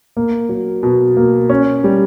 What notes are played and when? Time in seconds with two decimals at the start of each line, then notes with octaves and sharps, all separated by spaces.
0.17 A#3
0.49 F#3
0.83 B2
1.17 A#3
1.50 C#4
1.84 G3